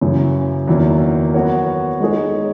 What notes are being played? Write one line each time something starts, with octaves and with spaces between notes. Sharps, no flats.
F#2 C#3 E3
E2 D#3 F#3 A#3 E4
F#3 B3 F#4 A#4 C#5
G#3 D#4 G#4 C#5